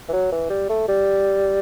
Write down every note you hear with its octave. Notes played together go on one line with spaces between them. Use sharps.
E3
F#3
E3
G3
A3
G3